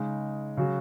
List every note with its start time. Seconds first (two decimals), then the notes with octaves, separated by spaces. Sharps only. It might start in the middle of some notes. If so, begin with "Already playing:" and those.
Already playing: C#3 G#3 D#4
0.57 C#3 F#3 C#4 F#4